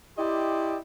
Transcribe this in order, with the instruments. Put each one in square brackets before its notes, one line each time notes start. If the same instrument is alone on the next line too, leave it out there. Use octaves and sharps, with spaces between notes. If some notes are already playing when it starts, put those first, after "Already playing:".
[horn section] E4 G4 D5 D#5 G5 C6